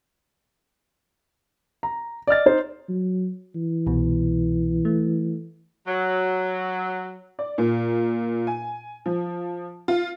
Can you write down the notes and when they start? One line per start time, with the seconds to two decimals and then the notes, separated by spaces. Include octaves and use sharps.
1.83 A#5
2.27 D5 D#5 F6 A6
2.46 D#4 C5
2.89 F#3
3.56 E3
3.87 C2 B2
4.85 A3
5.87 F#3
7.39 D5
7.58 A#2
8.47 G#5
9.06 F3
9.88 F4